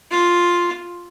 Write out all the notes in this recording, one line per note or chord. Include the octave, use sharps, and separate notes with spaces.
F4